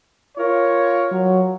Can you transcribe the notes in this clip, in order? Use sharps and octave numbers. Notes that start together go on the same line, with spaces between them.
F4 A#4 C#5
F#3